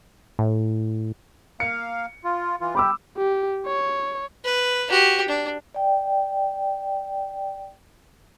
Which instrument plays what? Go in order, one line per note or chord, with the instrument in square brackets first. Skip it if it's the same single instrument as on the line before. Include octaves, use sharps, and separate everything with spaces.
[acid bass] A2
[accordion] A#3 F5 [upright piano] C#7
[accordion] F4
E3 F4
[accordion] G4 [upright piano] B5 D6 E6
[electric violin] G4
C#5
[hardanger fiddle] B4
F#4 G4
D4
[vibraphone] D5 G5